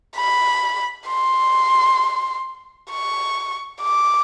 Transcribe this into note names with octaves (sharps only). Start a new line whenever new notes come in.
B5
C6
C#6
D6